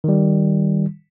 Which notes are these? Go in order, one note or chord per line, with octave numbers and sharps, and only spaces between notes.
D#3 G3